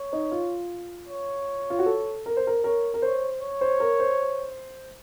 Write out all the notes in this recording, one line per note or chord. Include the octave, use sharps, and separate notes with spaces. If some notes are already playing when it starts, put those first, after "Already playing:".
Already playing: C#5
D#4
F4
C#5
F4
F#4
A4
A#4
C5
A#4
A#4 C#5
A#4
C5 C#5
C#5
C5
A#4
C5